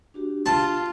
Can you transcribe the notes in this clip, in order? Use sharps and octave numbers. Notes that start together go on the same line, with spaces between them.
D4 F#4 G4
F4 A5